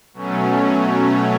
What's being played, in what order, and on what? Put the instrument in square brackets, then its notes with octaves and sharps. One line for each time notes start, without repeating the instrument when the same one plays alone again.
[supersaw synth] B2 F#3 A3 C#4